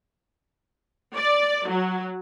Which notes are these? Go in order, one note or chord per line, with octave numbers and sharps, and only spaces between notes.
D5
F#3